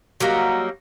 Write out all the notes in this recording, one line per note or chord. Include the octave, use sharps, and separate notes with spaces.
F#3 G3 A#3 D#4